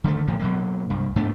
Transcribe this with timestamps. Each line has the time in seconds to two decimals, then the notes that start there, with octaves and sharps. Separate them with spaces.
0.04 D3 D#3 G#3 A3
0.27 A2 F3 A#3
0.39 B2 F#3 A#3
0.90 C2 G2
1.16 G#2 A3 B3 D4